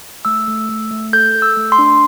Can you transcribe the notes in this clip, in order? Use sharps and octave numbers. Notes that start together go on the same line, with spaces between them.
A3 E6
A3
A3
A3
A4 G6
A4
E6
A3
C6
D4